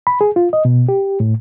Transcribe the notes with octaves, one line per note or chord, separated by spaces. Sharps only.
B5
G#4
F4
D#5
B2
G4
A2